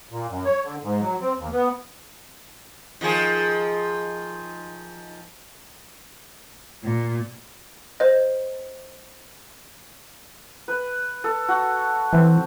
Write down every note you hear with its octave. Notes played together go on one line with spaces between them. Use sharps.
A#2
F#2
C#5
D3
G#2
F#3
C4
D#2
B3
D#3 F3 G#4
A#2
C5 D#5
B4
A4
F#4
E3 C4